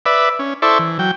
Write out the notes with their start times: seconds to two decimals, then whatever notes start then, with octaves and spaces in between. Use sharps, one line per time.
0.06 B4 D5 E5
0.39 C#4
0.62 E4 A4 C5 D5 E5 C#6
0.79 E3
0.99 F#3 G5